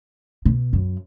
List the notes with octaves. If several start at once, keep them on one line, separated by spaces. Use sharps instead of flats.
B2
F#2